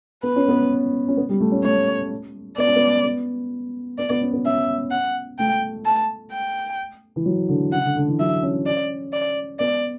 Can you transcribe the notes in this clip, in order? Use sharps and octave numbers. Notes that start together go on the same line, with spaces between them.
B3 B4
C#4
B3
C#4
B3
G3
A3
C#4
A3 C#5
B3 D5
C#4
B3
B3
B3 D5
B3
C#4
B3
C#4 E5
F#5
A3 G5
A5
G5
E3
F#3
D3
C#3 F#5
D3
D3
E3
F#3 E5
C#4
D5
D5
B3 D5